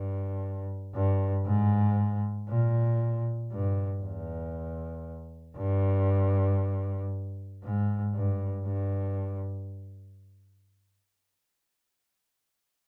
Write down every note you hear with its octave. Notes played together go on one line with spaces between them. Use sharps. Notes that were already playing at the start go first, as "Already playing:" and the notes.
Already playing: G2
G2
G#2
A#2
G2
E2
G2
G#2
G2
G2